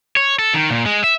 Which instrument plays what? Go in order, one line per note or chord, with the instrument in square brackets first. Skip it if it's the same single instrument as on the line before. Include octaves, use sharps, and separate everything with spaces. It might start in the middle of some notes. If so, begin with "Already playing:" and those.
[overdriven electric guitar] C#5
A4
D#3
A#2
G#3
E5